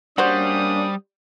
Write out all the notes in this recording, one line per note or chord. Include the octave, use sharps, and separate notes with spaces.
G3 A#3 C#4 D4 F#4 C5 D#6